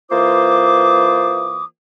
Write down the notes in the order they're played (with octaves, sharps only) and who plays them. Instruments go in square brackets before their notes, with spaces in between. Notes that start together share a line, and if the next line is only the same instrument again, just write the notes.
[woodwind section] E3 A#3 F4 C5 D6 D#6